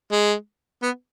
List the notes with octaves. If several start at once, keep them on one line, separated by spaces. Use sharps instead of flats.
G#3
B3